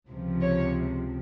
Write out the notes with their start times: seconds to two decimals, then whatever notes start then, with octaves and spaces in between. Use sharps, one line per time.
0.09 C#2 C3 F3
0.42 C#5